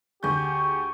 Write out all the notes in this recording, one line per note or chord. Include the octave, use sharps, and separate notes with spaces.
D2 G4 G#4 C#6 G6